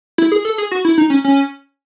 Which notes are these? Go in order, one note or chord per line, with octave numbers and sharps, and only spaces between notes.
E4
G#4
A4
G#4
F#4
E4
D#4
C#4
C#4